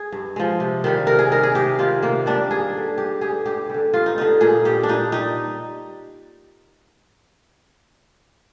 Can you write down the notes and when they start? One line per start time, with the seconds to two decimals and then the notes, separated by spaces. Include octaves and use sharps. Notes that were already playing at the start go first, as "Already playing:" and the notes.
Already playing: G#4
0.12 G2
0.36 F3 G#3
0.60 C3
0.84 D#3 G3
1.07 C3 A#4
1.19 G#4
1.32 D#3 G3 A#4
1.43 G#4
1.55 C3 G4
1.79 D#3 G3 F4
2.02 C3 A#3
2.26 D#3 G3 D4
2.50 G2 G#4
2.74 D3 G3
2.98 G2 G4
3.21 D3 G3 G#4
3.46 G2 G4
3.69 D3 G3
3.93 G2 F4
4.06 D#4
4.17 D3 G3 D#4
4.41 A#2 G#4
4.65 G3 G4
4.83 D4
4.88 A#2 D#4
5.12 G3 D#4